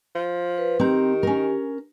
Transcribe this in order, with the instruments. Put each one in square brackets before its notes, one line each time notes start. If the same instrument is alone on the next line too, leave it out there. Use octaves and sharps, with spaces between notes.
[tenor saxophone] F3
[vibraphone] B4
[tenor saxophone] D#3 [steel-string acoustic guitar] C4 A#5 [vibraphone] G4
[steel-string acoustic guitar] C#4 A#4